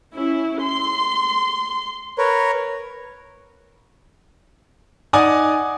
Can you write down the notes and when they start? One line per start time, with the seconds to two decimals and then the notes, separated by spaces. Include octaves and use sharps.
0.14 C#4 E4
0.63 C6
2.18 A#4 B4 C#5
5.13 D#4 D5 F#5 G#5 D6 D#6